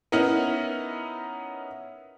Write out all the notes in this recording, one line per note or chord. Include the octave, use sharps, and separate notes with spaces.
B3 C#4 D#4 E4 A#4